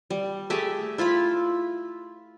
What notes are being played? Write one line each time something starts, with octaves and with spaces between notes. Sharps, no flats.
G3
A3 G4 G#4 E5
E4 F4 F5 B5